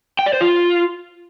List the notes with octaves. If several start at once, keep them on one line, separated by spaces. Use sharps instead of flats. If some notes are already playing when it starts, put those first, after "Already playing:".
G5
D5
C5
F4